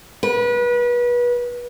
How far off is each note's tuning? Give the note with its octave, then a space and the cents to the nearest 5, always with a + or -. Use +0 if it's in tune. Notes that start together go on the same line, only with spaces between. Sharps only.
B4 -30